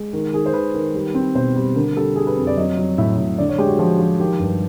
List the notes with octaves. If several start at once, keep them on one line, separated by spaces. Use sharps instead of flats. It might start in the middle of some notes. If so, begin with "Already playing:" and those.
Already playing: G#3
D#3
D#3 G#4
C5
D#3 B4
D#3
G3
C4
B2 C5
G3
D3 A#4
G3 A4
G3 G#4
B4
F2
D5
F#3 D#5
F#3
A2 E5
A2
D3 D5
C#5
G#3 G4
F#4
F3 F#4
F3
D#3 G4
G2